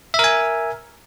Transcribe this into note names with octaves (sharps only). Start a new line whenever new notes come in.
A#4 E5 G#5